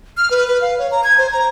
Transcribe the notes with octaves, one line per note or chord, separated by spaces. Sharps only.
F6
B4
B4
F5
C#5
A#5
G#6
C5
A#5